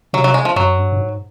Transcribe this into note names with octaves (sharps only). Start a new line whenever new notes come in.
C3 F#3
F#3
G#3
F3
F#2 F#3
G2
G2
G#2